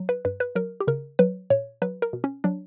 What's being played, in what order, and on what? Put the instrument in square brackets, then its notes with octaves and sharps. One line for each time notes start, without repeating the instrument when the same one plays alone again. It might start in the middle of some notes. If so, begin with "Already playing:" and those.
Already playing: [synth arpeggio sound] F#3
B4
G2 B4
B4
F#3 A#4
G4
C#3 A#4
F#3 B4
A#2 C#5
F#3 B4
A#4
B2
C#4
F#3 D4